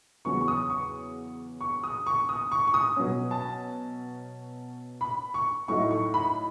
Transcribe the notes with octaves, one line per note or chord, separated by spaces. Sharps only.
E2 C#3 F#3 C#4 C#6
C#6
D#6
C#6
C#6
D#6
C#6
D#6
C#6
C#6
D#6
B2 F#3 C#4
A5
B5
C#6
A2 F#3 A3 D#4 C#6
C#6
B5